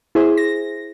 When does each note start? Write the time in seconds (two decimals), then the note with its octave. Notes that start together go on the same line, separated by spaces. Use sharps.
0.15 E4 G#4 C5
0.37 A#6